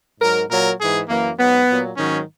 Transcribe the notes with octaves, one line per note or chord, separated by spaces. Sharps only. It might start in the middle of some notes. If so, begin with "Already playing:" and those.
G#2 F#3 A#4
A#2 F#3 A#4
G#2 E3 G#4
F#2 E3 A#3
G#2 F#3 B3
A#2 F#3
G#2 D#3 F#3 C#4